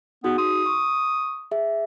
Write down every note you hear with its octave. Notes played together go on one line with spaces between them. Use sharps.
B3 D#4 F#4 G#4
C6 D#6
C#6
G#4 E5